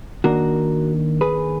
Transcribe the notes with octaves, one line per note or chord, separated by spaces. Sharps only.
D#3 A#3 D4 F#4 A#4
G#4 B4